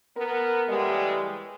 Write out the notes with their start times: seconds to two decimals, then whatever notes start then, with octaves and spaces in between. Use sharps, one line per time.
0.17 B3 A#4
0.68 A2 E3 G3 G#3